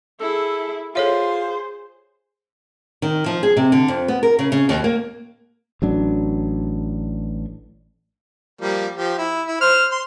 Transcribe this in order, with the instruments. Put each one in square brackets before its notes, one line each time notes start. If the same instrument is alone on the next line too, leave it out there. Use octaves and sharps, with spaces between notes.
[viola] E4 G#4 [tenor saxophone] A4
[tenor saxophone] F4 [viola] G#4 C5 [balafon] A4 C#5 E5
[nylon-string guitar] D#3
F3
G#4
C3
D3
F2
B3
A#4
C#3
C#3
D#2
A#3
[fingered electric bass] A1 F#3 D4
[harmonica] F3 G3 A#3
F3 G4
E4
E4
C5 F6
C6